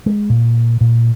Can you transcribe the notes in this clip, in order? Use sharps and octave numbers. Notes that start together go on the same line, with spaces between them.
G#3
A#2
A#2